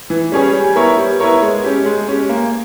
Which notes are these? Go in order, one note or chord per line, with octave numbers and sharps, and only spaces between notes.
E3
G3 C#4 G#4 C#5
G3
B3 E4 A#4 C#5
G3
B3 E4 A#4 C#5
G#3
C#4 G4
G#3
C#4 G4
A#3